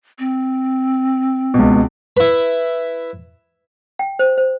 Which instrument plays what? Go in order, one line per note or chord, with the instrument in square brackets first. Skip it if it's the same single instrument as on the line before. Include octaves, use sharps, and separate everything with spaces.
[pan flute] C4
[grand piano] C#2 B2
[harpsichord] E4 B4
[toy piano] G5
C5
C5